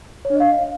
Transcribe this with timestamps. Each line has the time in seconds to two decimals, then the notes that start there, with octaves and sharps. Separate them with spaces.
0.25 C#5
0.30 D4
0.35 D#5
0.40 F5